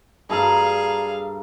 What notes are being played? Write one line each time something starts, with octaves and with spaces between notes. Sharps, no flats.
G2 G#4 A4 F5 A#5